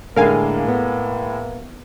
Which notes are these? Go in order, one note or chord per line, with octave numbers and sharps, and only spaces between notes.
A2 D3 G#3 A#3 A#4 F5 G#5
B3